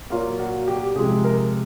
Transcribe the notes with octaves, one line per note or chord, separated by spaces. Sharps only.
A#2 F#3 A#3 F4
F#4
G4
C3 F3 G#3 G#4
A#4